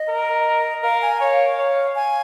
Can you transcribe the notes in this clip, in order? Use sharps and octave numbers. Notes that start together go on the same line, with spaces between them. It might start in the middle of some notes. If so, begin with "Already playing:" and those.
Already playing: D#5
A#4
A#4 F5
G#5
C#5 F5
C#5
G#5